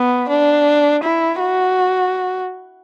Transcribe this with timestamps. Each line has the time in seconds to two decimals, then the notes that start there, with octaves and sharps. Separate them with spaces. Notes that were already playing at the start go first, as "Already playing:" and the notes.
Already playing: B3
0.29 D4
1.03 E4
1.41 F#4